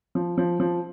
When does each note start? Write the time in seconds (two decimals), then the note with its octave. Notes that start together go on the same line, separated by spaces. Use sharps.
0.15 F3
0.37 F3
0.60 F3